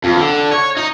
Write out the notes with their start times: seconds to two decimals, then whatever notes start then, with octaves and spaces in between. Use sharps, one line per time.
0.04 F2
0.17 D3
0.51 C#5
0.77 D#4